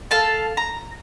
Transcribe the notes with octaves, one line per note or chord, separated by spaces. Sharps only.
A4 F5 A5
A#5